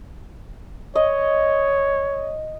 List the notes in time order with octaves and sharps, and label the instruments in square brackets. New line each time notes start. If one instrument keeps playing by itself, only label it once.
[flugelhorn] C#5 [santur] D#5